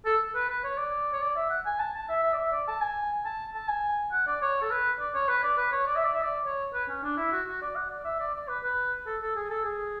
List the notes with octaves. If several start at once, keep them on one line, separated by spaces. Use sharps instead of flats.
A4
B4
B4
C#5
D5
C#5
D5
E5
F#5
G#5
A5
A5
E5
E5
D5
E5
D5
A5
G#5
A5
A5
G#5
F#5
D5
C#5
A4
B4
D5
C#5
B4
D5
B4
C#5
D5
E5
D5
E5
D5
C#5
B4
C#4
D4
E4
F#4
F#4
D5
F#5
D5
E5
D5
D5
B4
B4
A4
A4
G#4
A4
G#4